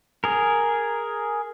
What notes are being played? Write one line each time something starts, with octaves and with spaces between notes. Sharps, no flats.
G#4 A#4